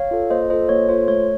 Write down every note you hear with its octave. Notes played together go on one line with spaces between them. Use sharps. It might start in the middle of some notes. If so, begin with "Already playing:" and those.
Already playing: C#5 F5
F4 A4
A#3 C5 D#5
F4 A4 C5 D#5
A#3 C#5
F4 A4 C5
A3 C#5